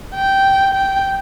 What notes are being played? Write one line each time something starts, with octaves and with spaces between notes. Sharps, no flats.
G5
G5